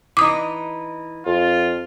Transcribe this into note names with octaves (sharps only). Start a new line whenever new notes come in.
E3 D#4 D6 D#6
F2 F4